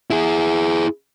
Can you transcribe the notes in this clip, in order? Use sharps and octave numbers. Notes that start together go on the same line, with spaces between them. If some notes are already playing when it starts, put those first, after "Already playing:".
E4 G#4